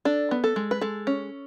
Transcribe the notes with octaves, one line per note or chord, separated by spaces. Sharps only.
D4 A4
B3
A4
G#3
B4
G#3 A4
C#4